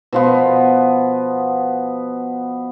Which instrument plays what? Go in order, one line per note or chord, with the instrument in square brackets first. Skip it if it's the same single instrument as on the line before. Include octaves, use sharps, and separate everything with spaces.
[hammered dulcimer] B2 F3 B3